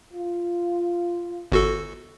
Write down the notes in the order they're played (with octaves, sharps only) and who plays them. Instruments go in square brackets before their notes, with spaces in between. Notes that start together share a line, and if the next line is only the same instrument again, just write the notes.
[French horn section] F4
[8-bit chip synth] G1 F#4 A4